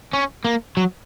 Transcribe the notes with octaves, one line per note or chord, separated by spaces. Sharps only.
C#4
A#3
F#3